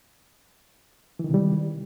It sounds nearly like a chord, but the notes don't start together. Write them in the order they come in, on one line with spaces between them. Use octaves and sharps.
E3 D#3 C3 G3